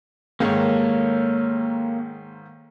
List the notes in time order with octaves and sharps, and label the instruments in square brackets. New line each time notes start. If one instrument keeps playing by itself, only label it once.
[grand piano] G#2 D#3 G#3 [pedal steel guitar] A#3 A4 C#5